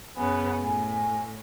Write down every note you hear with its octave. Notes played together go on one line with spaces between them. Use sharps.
F#2 C#3 B3 G#5
A2 G#5